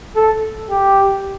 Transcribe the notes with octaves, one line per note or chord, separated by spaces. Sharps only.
A4
G4